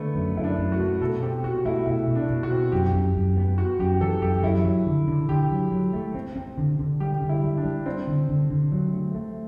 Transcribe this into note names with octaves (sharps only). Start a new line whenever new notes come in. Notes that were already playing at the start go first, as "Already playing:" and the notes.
Already playing: D3 A3 B3
F#2
F#2 E4
D4
F#2
F#4
A3
B2 A4
C4 G4
B2 F#4
A3 E4
B2 E4
B2
D4
B2
F#4
C4
F#2 G4
F#2
F#2
B3
B3 F#4
F#2 G4
E3 A4
F#2 G4
F#3 E4
F#3
D3
D3
D3 G4
F#3
F#3
A3
C4
C4
D3
D3
G3 G4
D3
E4
G3
D4
G3
C4 D4
D3
D3
D3
F#3
A3
A3